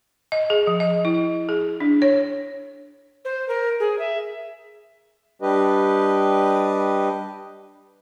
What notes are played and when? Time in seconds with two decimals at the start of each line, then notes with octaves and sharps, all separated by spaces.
0.32 D#5
0.50 G#4
0.67 F3
0.80 D#5
1.05 E4
1.49 G#4
1.80 D4
2.02 C#5
3.25 C5
3.48 A#4
3.80 G#4
3.99 E5
5.42 G3 D4 G4 B4 D#5